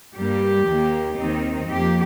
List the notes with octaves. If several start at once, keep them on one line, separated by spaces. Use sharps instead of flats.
G2 G3 A#3 G4
D#2 D#3 A#3
D#2 D#3 C4 D#4
F2 F3 A#3 G4